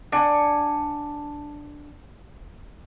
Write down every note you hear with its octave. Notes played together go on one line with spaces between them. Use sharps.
D4 F#5 G#5